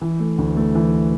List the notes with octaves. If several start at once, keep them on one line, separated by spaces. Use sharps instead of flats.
E3
A3
D2
A3
E3